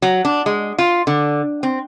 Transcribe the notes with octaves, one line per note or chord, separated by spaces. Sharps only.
F#3
D4
G#3
F4
D3
C4